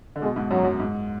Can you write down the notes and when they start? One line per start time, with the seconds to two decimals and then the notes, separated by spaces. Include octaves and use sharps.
0.16 D3
0.22 B2 G#3
0.36 G#2
0.51 F#2 F#3
0.64 F#2
0.80 G#2